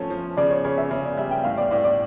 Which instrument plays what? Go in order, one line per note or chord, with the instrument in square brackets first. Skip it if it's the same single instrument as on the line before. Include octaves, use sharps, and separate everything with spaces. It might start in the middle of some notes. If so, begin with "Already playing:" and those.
Already playing: [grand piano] F3 A3 C#4 [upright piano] C#5 A5
[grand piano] F3
[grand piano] C#3 [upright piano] D5
[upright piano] C#5
[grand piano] C#3 [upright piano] C#5
[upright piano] E5
[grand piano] C#3 [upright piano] C#5
[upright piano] D5
[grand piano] G3 [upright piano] E5
[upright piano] G5
[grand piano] A2 [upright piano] F5
[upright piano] D5
[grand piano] A2 [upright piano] D5
[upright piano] D5